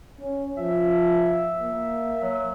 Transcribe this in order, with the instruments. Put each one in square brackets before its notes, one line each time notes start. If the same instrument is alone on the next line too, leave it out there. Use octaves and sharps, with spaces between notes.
[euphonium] C#4
[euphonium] F3 [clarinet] E5
[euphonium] A#3
[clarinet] F#3